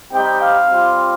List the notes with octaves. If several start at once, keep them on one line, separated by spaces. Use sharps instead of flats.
G3 C4 D#4 G4 G5
F5
G3 C4 F4